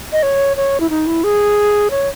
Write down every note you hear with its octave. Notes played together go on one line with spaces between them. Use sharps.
D#5
C#5
C#5
E4
D#4
E4
G#4
C#5